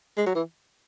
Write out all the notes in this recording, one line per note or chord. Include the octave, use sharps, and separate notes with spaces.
G#3
F#3
E3